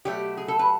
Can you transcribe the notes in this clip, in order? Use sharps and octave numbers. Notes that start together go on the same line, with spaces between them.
B2 F#3 A3 G4
G#4
A4
B4